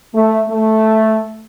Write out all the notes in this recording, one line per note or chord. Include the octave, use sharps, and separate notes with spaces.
A3
A3